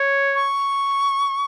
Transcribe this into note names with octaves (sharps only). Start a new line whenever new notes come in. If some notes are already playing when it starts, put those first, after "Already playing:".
Already playing: C#5
C#6